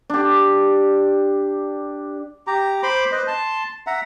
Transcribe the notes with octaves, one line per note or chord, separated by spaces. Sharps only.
D4 G4
G4 A#5
C5 B5 C6 D6
B4 C5 D#5
A5 C6
E5 F#5 A#5